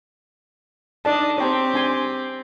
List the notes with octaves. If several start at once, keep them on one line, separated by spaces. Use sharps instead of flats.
D4 D#4 D5 D#5 A5
C4 G4 C#5 G5 A#5
D4 G#5 C6